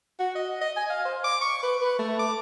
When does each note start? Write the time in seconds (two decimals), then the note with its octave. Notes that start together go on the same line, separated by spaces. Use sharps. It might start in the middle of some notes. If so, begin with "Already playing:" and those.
0.20 F#4
0.35 D#5
0.61 D#5
0.76 G#5
0.90 F5
1.05 C5
1.24 D6
1.41 C#6
1.63 B4
1.81 B4
1.98 A3
2.19 D6